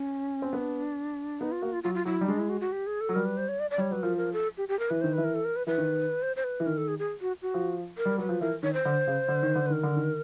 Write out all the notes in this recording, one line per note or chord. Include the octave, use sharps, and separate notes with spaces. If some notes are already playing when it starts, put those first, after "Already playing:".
Already playing: C#4
C4
B3 D4
B3 D#4
F4
A#3 F#4
F4
F#3 F4
F4
F#3 E4
G3 D#4
G#3 D4
E4
F#4
F#4
G4
G#4
A4
F#3
G3 A#4
B4
C5
C#5
D5
D5
G3 C#5
F#3 B4
F3 A#4
A#4
A4
G4
G4
A#4
E3 B4
D#3 C5
E3 B4
A#4
A4
A#4
B4
E3 B4
D#3
C5
C5
B4
E3
D#3 A#4
A4
G#4
G#4
F#4
F#4
F3
A#4
G3
F#3 B4
F3
E3 A#4
D#3 C#5
C5
D3
C#3
D3
D#3
D3
B4
D#3 A#4
D3
D#3